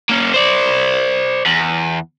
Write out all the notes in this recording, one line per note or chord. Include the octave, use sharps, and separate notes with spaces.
A#3 C#4
C5 D5
E2